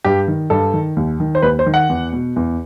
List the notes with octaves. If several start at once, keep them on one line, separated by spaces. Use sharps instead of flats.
G2 G4
D#3
G2 A4
D#3
D#2
D#3
C5
D#2 B4
C5
D#3
F#5
E2
B2
E2